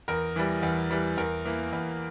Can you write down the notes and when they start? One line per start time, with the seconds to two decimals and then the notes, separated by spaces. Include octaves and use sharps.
0.08 E2 A#4
0.36 E3 G3
0.62 E2
0.91 E3 G3
1.17 E2 A#4
1.45 E3 A#3
1.72 E2